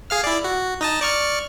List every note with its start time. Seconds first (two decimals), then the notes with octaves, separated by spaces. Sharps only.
0.10 G#4 F5 F6
0.24 E4 D5
0.44 F#4
0.81 D#4 D#5 A5
1.01 D5 C#6 F6